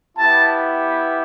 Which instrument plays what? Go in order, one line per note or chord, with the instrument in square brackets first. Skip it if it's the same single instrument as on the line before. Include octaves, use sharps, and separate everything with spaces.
[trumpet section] B3 E4 G4 A5